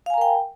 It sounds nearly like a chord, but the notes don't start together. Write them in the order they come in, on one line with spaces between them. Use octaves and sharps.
F5 G#5 A#5 A#4 G5